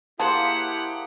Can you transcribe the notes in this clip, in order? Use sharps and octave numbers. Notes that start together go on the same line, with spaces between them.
A#3 E4 G4 G#4 C5 F#5 A5 C6